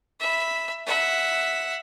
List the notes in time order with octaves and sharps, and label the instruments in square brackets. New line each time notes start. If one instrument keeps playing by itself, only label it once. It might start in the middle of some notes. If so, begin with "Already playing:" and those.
[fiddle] E5 B5
E5 F#5